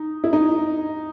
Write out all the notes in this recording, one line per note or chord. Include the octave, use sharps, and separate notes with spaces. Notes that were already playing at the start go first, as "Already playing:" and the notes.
Already playing: D#4
E4
D#4